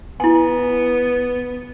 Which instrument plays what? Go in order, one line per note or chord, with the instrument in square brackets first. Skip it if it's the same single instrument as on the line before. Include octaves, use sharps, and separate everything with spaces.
[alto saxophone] B3 [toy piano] E4 G#5